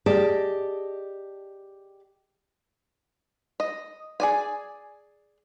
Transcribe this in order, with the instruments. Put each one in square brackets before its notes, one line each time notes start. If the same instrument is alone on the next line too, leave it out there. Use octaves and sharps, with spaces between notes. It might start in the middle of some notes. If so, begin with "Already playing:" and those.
[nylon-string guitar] G4 G#4 D5 D#5 A5
[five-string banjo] D#5
G#4 D5 G#5